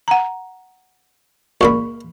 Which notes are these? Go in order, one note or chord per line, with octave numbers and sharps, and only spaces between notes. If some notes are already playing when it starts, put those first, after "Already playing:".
F#5 A#5
C#2 A#2 B5 C#6